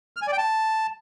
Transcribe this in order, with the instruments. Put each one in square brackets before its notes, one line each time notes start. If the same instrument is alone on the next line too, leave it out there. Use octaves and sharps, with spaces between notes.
[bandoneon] F6
G#5
D5
G5
A5